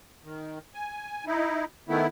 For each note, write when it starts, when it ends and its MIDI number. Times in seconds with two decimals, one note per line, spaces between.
0.24 0.59 51
0.75 1.25 80
1.27 1.65 63
1.27 1.65 64
1.89 2.07 51
1.89 2.07 57
1.89 2.07 59
1.89 2.07 64